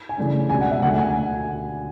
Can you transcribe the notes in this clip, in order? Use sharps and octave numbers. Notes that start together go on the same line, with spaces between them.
G#5
C#3 E3 A3 D4
C#2 B2 G#3 D4 G#5
F#5
E5
D2 D3 A3 F#5
G#5